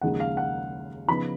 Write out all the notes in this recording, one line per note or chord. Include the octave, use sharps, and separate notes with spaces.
D#2 C#3 F3 G#3 D#4 F#5
F5
F#5
C#3 F3 B3 D#4 B5